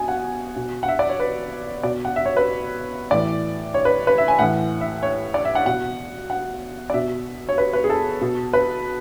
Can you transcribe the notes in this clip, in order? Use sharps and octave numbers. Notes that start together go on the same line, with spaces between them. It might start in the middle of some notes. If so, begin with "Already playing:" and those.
Already playing: B2 G#5
F#5
B2
F#5
E5
D5
C#5
B4
B2 D5
F#5
E5
C#5
B4
A2 E3 D5
C#5
B4
B4
E5
G#5
A2 E3 F#5
E5
C#5
D5
E5
F#5
B2 F#5
F#5
D5
B2 E5
C#5
B4
B4
G#4
A4
B2
B4